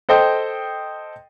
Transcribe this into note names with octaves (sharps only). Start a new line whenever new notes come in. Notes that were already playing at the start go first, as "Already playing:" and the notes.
A4 C5 D#5 G5